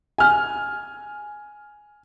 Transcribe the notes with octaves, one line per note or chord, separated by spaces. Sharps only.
G#5 F6